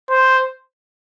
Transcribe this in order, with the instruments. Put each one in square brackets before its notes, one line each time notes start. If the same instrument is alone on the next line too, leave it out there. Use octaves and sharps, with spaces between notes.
[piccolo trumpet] C5